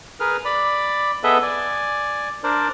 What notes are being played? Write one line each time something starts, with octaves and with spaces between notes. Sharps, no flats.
G#4 A#4 B4 F6
D5 B5
B3 G#4 A4 B4 D#5 E5
D5 G#5
D4 A#4 C5 D5